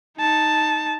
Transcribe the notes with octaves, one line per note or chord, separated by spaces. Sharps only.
D#4 A5